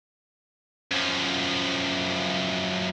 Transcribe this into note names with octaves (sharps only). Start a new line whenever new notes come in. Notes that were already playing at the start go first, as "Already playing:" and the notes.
F#2 F3